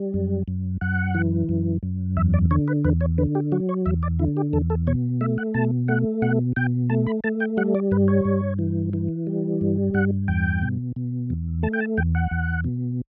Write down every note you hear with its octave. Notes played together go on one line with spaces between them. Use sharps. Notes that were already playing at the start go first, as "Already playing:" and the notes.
Already playing: G3
F#2
F#2
F#2 F#5
E3
F#2
F#2
E2 E5
D5
D3 C#5
B4
E2 B4
C#5
D3 B4
G4
F#3 F#4
C#5
E2 E5
D5
D3 E4
G4
E2 A4
A4
B2 C#5
A3 E5
F#5
B2 A5
A3 F#5
B2 F#5
B2 G5
A3 A5
B5
A3 A5
G5
G3 F#5
D5
G2 B4
C#5
G2
E3
E3
G3
G2
G2 F#5
E2 G5
B2
B2
E2
A3 A5
G5
A5
E2 G5
F#5
E2
B2